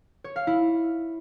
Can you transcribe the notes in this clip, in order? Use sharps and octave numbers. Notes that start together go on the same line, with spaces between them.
C#5
F5
E4